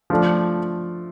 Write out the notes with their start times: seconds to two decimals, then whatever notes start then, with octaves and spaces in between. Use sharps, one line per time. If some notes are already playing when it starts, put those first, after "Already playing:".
0.10 F3 A3 D4